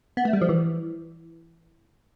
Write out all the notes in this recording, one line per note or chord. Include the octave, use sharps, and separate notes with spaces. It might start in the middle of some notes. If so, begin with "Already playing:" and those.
B3
A3
G3
F3
E3